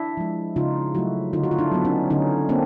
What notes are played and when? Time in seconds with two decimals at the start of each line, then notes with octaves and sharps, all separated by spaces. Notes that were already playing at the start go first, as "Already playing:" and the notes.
Already playing: D4 E4
0.17 F3 G#3
0.56 C#3 D#4 F4
0.95 F#3 A3 E4 F#4
1.33 D3 D#4 F4
1.44 F#4
1.51 F4
1.59 D4 E4
1.72 F#3 B3
1.85 C#4 D#4
2.10 D3 C#4 D#4
2.49 A#3 C4 D4